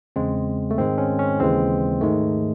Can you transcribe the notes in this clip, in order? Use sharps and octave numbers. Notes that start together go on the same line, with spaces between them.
E2 C#3 G#3 C4
A3
G#2 D#3 G#3 C4
C#4
C#4
D#2 C#3 E3 G#3 C4
G#2 D#3 G#3 A3